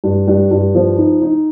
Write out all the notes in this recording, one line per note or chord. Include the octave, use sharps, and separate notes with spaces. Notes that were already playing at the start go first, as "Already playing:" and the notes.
G2
G2
G2
F3
D#4
D#4